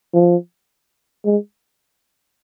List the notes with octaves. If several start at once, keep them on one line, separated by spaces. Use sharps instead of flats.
F3
G#3